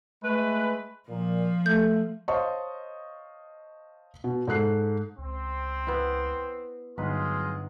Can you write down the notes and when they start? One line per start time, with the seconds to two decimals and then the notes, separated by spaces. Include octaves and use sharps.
0.23 G#3 A3 B4
1.09 A#2 F3
1.66 A3 G6
2.28 C5 C#5 D#5 F5 A5 C#6
4.24 B2
4.47 G#2 A4 F#6 C7
5.18 C#2 C4
5.87 B3 E4
6.98 G1 F#3 G#3 D#4 F4 B4